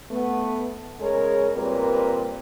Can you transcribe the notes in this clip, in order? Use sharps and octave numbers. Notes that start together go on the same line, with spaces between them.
A3 B3
C#3 G#3 G#4 A#4 C#5
A#2 G3 C4 A#4 B4